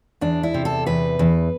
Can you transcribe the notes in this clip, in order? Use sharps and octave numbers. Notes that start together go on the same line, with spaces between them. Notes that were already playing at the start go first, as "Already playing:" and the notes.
E2 D4
E4
C3
A4
E2 B4
E2